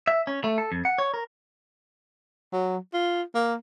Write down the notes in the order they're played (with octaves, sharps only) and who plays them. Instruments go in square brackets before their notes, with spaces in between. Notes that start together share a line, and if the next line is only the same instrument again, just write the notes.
[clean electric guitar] E5
C#4
A3
A4
F2
F#5
C#5
A#4
[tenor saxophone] F#3
F4
A#3